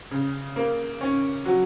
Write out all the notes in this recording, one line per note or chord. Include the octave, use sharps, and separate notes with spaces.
C#3
A#3
C#4
F#3